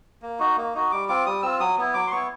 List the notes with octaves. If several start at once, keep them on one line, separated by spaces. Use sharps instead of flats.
A#3
D#4 F#4
A#3
D#4 F#4
G3 D6
C4 F4 D6
G3 D#6
C4 F4 E6
F#3 D#6
B3 E4
F#3 D6
C6
B3 E4 C#6